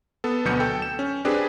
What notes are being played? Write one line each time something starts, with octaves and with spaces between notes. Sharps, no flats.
B3 A4
D2 B2 F#3 B3 G6 C#7
A4 G5
E7
C#4
C4 D4 G4 G#4 B4